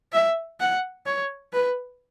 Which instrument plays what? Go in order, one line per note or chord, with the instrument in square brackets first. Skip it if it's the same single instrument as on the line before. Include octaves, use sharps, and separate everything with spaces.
[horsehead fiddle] E5
F#5
C#5
B4